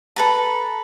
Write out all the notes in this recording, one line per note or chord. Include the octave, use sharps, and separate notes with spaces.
A4 B4 A#5